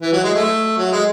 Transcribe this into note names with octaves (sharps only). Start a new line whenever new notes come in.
E3
F#3
G#3
A3
F#3
G#3